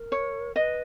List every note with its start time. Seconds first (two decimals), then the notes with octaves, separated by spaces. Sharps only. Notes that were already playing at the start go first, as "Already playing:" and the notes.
Already playing: A#4
0.12 C#5
0.56 B4 D#5